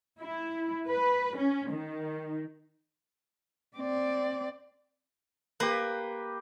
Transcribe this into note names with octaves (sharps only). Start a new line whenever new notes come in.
E4
B4
C#4
D#3
C4 D5
A#3 G4 B4